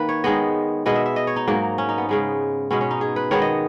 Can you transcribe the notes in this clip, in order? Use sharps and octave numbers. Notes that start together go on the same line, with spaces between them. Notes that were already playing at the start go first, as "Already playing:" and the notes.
Already playing: D#3 A#3 B4
C#5
D#3 G#3 B3 D#5
B2 G#3 B3 D#5
E5
E5
D#5
C#5
D#4
G#2 F#3 A#3
C#4
D#4
B3
C#3 G#3 B3
B2 G#3 B3 C#4
C#4
D#4
G#4
B4
D#3 G#3 B3 C#5
D#5